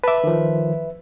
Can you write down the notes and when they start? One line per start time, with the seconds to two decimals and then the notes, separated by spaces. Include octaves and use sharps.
0.04 B4 E5 A5 D6
0.24 D#3 F3